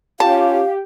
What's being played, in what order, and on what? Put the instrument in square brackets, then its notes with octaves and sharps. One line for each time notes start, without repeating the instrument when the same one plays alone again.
[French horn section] C#4 F4 [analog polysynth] G4 [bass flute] F5 [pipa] A5